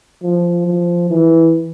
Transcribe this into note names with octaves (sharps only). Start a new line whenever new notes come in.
F3
F3
E3